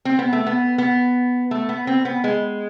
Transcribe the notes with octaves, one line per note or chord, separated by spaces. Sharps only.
C4
B3
A3
B3
B3
A3
B3
C4
B3
G#3